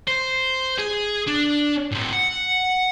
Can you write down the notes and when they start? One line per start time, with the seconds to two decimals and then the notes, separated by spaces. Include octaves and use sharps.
0.07 C5
0.78 G#4
1.27 D4
1.91 A2 C4
2.13 F#5